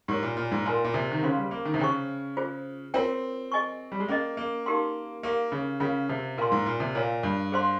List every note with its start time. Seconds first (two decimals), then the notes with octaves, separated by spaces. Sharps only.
0.08 G#2 G4 A#4 C#5
0.23 A#2
0.37 A#2
0.52 G#2
0.66 A#2 A#4 F5 G#5 C6
0.84 A#2
0.94 C3
1.12 D#3
1.23 C#3 C#4 G#4 C5 F5 C6
1.37 G3
1.51 A#3
1.65 D#3
1.74 C3
1.80 C#3 C5 G5 C#6
2.37 F4 G#4 C5
2.94 C4 F4 A#4 C#5 G5
3.52 G#4 D#5 G#5 C#6
3.92 G3
4.00 G#3
4.08 A#3 C#4 G#4 D#5
4.37 A#3
4.66 D#4 G4 A#4 F5 C6
5.23 A#3 G4 A#4 F5
5.52 C#3
5.80 C#3 C#4 F4 A#4 F5
6.09 C3
6.38 A#2 A#4 F5 C6
6.52 G#2
6.66 A#2
6.80 C3
6.95 A#2 A#4 C#5 F5
7.23 G2
7.52 G#4 C5 F5 C6